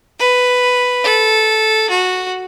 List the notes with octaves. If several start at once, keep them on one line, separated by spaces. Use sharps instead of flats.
B4
A4
F#4